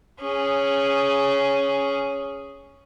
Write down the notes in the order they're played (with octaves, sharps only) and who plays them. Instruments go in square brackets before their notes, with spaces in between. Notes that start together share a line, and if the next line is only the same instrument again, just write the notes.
[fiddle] C#4 G#4